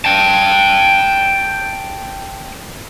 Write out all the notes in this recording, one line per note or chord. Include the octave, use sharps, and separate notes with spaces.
G5 A5